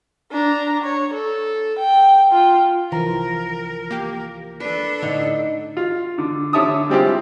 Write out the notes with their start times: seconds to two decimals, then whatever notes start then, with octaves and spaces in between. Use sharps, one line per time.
0.31 D4 A#5
0.84 C#5
1.14 A4
1.79 G5
2.32 F4 G5
2.92 C2 E3 F3 A#4 A#5
3.90 A#3 G4
4.60 D4 A4 B4
5.03 A2 D3 D#4
5.77 F4
6.18 D3
6.53 D3 C#5 E5 A5 D#6
6.89 G3 G#3 C4 E4 F4 G4